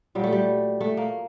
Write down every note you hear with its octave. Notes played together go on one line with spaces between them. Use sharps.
A#2 F#3 G3
A3
G3
A3
A#3